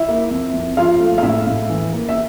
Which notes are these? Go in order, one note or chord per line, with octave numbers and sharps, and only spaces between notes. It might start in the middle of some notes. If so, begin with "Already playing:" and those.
Already playing: E4 E5
A#3
F2
F2
F3 F4 F5
A3
F5
A2 E4 E5
A2
E3
A#3
E5